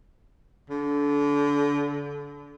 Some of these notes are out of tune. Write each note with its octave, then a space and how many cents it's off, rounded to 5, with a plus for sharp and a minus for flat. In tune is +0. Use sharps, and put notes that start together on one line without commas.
D3 -30